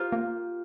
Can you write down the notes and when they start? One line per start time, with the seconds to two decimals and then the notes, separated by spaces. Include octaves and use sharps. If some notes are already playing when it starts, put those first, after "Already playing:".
Already playing: F4 G4 A#4 C5
0.12 A#3